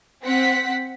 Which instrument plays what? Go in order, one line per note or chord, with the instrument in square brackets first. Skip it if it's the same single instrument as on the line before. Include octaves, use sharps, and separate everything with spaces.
[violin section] C4 F#5 B6